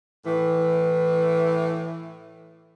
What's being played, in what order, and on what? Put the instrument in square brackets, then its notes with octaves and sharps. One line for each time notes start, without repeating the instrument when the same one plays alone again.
[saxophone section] A2 E3